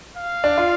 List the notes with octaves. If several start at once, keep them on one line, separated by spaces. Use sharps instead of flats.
F5
D4
F4